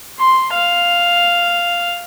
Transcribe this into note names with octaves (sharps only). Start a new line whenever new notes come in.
C6
F5